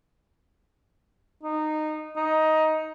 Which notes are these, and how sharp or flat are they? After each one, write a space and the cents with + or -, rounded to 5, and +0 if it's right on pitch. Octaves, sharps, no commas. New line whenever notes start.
D#4 -15
D#4 +10